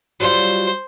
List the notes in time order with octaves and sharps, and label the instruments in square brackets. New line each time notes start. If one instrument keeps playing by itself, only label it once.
[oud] F#3 G3 F4 [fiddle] C5